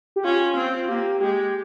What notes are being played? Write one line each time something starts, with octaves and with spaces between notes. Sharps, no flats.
G4
C#4 F4
C4
A#3 G4
G#3 G4